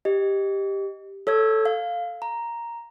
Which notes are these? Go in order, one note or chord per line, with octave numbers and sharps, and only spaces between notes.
G4 D#5
A4 C#5 E6 G#6
F5
A#5